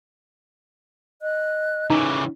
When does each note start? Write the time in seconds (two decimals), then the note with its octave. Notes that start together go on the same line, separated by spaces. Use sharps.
1.22 D#5 F#6
1.90 C#3 E3 D#4 C#5 G#5 D6